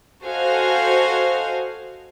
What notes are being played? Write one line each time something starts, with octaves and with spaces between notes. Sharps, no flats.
F#4 A4 C5 D#5 F5 G#5